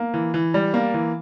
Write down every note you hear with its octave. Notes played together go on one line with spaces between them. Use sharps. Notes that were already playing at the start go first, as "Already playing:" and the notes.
Already playing: A#3
E3
E3
G3
A#3
E3